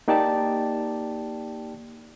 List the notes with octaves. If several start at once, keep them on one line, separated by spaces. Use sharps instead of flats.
A#3 D#4 G4 D5 G5 A5